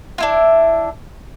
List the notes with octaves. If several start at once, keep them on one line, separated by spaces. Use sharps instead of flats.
D4 E4 F4